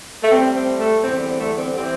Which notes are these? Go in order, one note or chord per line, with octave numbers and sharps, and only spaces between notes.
A3
A2 G3 C4
C4
A3
E2 D3 G3 C4
C4
A3
C4
E3 G3 C4